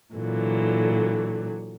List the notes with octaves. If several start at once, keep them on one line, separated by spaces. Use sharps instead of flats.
A#2 D3 E3 F#3